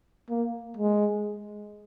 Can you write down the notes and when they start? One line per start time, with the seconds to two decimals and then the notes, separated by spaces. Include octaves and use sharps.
0.30 A#3
0.77 G#3